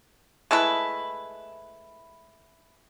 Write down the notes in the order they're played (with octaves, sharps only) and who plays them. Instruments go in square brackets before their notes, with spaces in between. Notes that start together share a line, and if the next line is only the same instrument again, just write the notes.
[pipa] G#3 A3 E4 B4